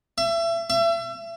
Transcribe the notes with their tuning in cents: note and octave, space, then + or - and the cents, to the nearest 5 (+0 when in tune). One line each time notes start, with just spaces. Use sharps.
E5 +30
E5 +35